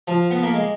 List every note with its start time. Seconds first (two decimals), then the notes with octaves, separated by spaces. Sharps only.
0.08 F3
0.31 B3
0.43 A#3
0.54 G#3